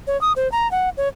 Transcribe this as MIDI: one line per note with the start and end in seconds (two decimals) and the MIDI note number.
0.07 0.19 73
0.21 0.32 87
0.36 0.50 72
0.52 0.70 82
0.71 0.89 78
0.97 1.08 73